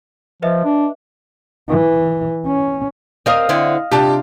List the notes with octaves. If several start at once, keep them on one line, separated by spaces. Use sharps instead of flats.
F3 B4 D#5 E5
D4
E3
C#4
C4 A#4 D#5 F5 D#6
D3 C4 E4
C3 D4 F4 G4 A5